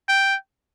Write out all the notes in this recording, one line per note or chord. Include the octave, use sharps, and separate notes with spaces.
G5